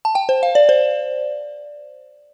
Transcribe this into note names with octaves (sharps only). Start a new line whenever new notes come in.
A5
G5
C5
F5
D5
C5